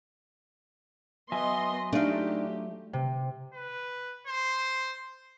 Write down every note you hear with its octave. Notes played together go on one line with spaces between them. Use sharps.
F#3 B3 D#5 E5 G#5 C6
A3 D4 D#4 F4 G4
C3
B4
C5